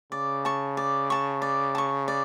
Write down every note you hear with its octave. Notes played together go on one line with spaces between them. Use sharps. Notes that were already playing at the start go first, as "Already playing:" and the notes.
C#3 D5
A5 C#6
D5
A5 C#6
D5
A5 C#6
D5